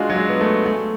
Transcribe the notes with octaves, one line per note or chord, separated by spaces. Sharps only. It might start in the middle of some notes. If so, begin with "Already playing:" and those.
Already playing: G#3 D4 F4 F#4
F#3
G#3
B3
A3
A3